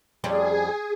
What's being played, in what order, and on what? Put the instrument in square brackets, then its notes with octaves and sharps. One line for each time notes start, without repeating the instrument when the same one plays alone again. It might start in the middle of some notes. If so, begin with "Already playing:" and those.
[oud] F2 G3 C#4 [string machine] G#4